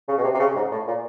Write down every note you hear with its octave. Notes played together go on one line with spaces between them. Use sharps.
C#3
B2
C3
C3
C#3
G#2
A2
A#2